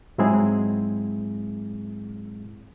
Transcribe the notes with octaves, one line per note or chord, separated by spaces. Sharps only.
G#2 F#3 G#3 C4 E4 G#4